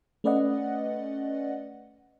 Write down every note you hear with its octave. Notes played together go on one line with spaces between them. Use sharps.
A3 C#4 B4 D5 D#5 F#5